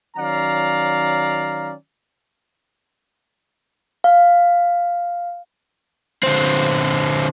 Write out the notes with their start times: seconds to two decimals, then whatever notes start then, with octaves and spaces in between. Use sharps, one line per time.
0.17 D#3 F#3 C#4 D5 F5 A#5
4.04 F5
6.23 D3 C4